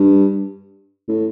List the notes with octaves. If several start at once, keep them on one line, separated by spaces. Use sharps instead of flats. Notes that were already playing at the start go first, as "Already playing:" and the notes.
Already playing: G2
A2